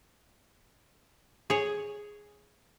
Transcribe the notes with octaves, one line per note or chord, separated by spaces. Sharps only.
G#4 C#5